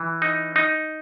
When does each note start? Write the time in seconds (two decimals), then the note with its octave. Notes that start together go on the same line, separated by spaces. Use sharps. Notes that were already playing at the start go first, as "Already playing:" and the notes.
Already playing: E3
0.22 D#4
0.56 D#4